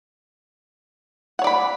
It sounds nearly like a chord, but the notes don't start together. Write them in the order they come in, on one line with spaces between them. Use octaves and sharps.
F#5 C#5 D5 B5